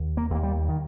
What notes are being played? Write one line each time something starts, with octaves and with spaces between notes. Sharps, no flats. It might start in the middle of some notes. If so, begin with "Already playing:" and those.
Already playing: D#2
A#3
D#2 A#3
G3
D#3